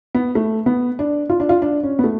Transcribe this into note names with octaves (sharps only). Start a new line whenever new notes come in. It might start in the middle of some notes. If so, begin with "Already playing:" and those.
B3
A3
B3
D4
F4
D4
F4
D4
C#4
B3
A3